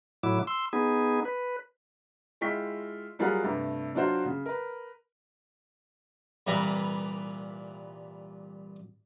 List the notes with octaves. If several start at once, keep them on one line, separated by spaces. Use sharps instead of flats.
A2 F#3 E4 D6
C6 E6
B3 D#4 G#4
B4
G#3 E4 F4 G5 C#6 B6
F#3 G3 F4 G#4 A#4 F#5
G2 C3 A3
F#3 D4 F4 F#4 C5
C#3
A#4 B4
C2 A#2 E3 G3 B4 A#5